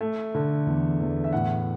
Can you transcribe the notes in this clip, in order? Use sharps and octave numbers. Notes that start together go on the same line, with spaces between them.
A3
D3
E2
E2
E5
A2 F#5